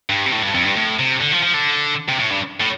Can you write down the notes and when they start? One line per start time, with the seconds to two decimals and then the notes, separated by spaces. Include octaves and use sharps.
0.10 G2
0.26 C3
0.32 A2
0.43 G2
0.54 F2
0.65 G2
0.76 A2
0.99 C3
1.20 D3
1.32 F3
1.42 F3
1.53 D3
2.09 C3
2.20 A2
2.31 G2
2.61 A2